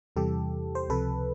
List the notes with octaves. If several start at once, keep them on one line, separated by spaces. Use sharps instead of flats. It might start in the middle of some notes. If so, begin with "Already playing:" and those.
E2 C3 E3 G3 G4 A4
C5
C#2 C3 F3 A4 B4